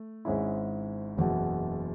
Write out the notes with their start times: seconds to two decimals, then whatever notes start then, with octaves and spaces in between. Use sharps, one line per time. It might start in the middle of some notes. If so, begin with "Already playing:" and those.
Already playing: A3
0.25 G#1 G#2 G#3 C#4 E4
1.17 F#1 E2 B2